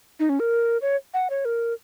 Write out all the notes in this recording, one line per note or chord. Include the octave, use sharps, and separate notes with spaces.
D#4
C#4
A#4
C#5
F#5
C#5
A#4